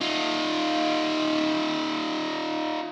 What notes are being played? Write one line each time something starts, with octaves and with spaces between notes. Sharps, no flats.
D#4 F4